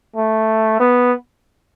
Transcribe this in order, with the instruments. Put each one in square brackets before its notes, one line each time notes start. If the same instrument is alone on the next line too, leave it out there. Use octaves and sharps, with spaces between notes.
[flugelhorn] A3
B3